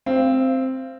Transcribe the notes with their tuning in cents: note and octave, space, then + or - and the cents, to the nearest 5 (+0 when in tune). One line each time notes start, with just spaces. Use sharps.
C4 +0 F5 -30